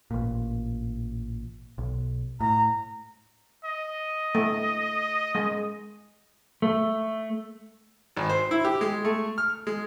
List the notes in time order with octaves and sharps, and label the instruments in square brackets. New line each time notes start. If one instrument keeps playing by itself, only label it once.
[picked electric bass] A1 A#2
B1
[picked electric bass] A2 [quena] A#5
[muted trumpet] D#5
[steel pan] A3
G#3
[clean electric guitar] A3
[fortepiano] G#1
C5
E4
G4
G#3
A3
F6
G#3